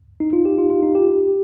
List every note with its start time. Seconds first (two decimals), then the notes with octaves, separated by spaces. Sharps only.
0.20 D#4
0.33 F4
0.45 G4
0.58 F4
0.70 F4
0.82 D#4
0.95 G4